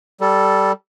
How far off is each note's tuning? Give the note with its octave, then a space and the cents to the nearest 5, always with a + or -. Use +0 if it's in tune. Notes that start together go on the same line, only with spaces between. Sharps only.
G3 -10 A4 +0